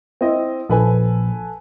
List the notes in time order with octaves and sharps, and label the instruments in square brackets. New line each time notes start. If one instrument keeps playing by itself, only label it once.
[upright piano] C4 E4 D#5
[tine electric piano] A#1 [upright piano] A4 B4 G#5